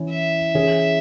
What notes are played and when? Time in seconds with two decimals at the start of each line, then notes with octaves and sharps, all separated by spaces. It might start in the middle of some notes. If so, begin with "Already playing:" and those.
Already playing: E3 C#4 E4
0.10 E5
0.55 E3 C#4 G#4